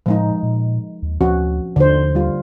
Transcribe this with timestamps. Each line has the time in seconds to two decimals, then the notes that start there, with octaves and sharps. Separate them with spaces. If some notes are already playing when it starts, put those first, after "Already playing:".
0.06 A2 F3 G#3 D#4
0.43 A#2
1.03 D#2
1.21 D2 F3 C#4 F#4
1.76 D#2 D3 D#4 C5
2.15 G3 F4